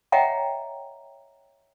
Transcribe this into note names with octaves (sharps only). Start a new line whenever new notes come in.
C#5 D#5 E5 F#5 G5 A#5